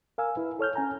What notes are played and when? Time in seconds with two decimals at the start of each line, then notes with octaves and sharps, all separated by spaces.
0.18 A#4 F5 G#5 E6
0.37 E4 B4
0.59 A4 C#5 F6 G6
0.75 C#4 G#5 A#5